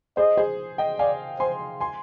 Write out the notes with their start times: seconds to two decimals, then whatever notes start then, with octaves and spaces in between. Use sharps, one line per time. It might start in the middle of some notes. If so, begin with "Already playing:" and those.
0.17 G#4 C5 D#5
0.37 G#4 C5
0.78 D#5 G5
0.99 D5 F5 G#5
1.40 C5 G#5 C6
1.80 G#5 C6